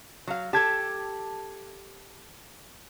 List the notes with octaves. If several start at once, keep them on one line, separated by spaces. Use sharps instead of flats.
F#3 F5
G4 A4 A5 G#6